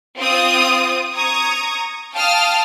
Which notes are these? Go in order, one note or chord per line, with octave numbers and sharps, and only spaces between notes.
C4 F4 D#6
A#5 C#6 D#6 G#6
F5 G5 A5 D#6 F6